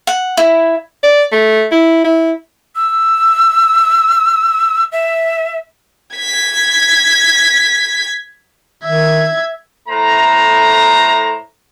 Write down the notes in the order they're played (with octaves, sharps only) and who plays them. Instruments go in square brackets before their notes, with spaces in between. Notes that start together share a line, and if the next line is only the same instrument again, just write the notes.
[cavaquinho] F#5
E4
[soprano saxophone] D5
A3
E4
E4
[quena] E6
E5
[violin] G#6 B6
[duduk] D#3 [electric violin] E5 G#6
[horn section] A2 A3 C5 A#5